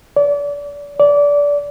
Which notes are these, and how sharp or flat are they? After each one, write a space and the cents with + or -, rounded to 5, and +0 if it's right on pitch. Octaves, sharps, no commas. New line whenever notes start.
D5 -35
D5 -25